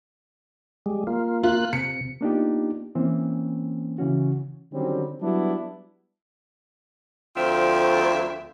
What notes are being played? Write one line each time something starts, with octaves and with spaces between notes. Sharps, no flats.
G3 G#3
A#3 F4
A#3 F4 F#6
C3 C#7
A#3 B3 D4 D#4 F4 G4
E3 A#3 C4 C#4
C#3 E3 C#4 F#4
D3 D#3 F#3 G3 C4 C#4
F#3 G3 B3 D4 E4 F#4
D2 F3 C4 F4 E5